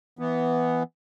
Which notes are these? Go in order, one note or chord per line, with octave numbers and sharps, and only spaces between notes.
E3 B3